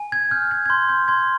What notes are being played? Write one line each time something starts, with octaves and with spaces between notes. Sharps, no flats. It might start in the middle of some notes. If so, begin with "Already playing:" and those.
Already playing: G#5
G#6
F6 G6
G#6
G#6
C6 G6
G6
C6 G#6